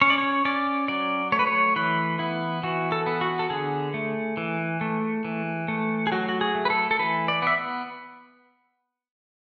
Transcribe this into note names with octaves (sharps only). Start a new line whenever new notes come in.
C#4 C#5
D5
C#5
C#4 D5
F#3 D5
A3 C#5
B4
C#5
E3 B4
B3 E4
E3 F#4
A4
B3
F#4
A4
D3 G#4
A3
E3
A3
E3
A3
G#4
F#3 F#4
F#4
G#4
A3
B4
A4
A4
E3 B4
D5
B3 E5